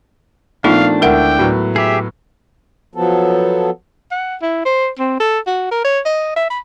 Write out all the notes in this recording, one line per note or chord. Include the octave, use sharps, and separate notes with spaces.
A#2 F3 A3 B3 D4 D#4 F4 F5
D2 G#3 E4 A#4 F#5 G5
A2 F#3 B3
G4 G#4 E5
F3 F#3 B3 A4
F#5
E4
C5
C4
A4
F#4
A#4
C#5
D#5
E5
B5